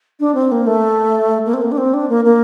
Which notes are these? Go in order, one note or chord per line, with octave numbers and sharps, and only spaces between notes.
D4
C4
A#3
A3
A#3
C4
A#3
D4
C4
D4
A#3
A#3